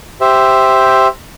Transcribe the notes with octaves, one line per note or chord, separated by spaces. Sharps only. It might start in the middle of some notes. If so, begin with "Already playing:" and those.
G4 C5 E5